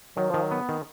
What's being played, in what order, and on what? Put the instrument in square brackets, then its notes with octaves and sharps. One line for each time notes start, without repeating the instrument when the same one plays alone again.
[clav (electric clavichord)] D#3 [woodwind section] F#3
[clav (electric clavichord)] D#3 [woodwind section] F3
[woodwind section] F#3
[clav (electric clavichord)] B3
D#3